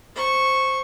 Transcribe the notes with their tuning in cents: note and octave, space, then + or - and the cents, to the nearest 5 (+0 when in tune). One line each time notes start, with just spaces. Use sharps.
C5 +0 C#6 -10